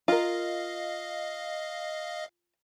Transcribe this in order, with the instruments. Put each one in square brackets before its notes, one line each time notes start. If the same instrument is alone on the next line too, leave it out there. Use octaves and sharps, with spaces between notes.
[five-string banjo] F4 A#4 [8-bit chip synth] D#5 F5